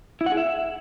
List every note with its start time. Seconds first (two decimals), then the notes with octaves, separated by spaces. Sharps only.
0.21 E4
0.26 F#5
0.32 G#4
0.37 E5